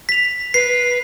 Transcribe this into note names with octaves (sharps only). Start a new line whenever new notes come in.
B6 F7
B4 C7